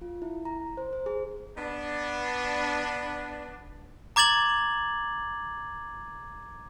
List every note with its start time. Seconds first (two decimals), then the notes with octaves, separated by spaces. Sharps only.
0.01 F4
0.22 E4
0.45 A#5
0.77 C5
0.93 C5
1.06 G#4
1.57 B3 D4
4.16 A#5 D6 G#6 A6 F#7